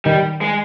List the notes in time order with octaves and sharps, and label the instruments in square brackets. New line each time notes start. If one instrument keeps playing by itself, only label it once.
[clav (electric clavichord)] D#3 [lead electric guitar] G3
[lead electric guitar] G#3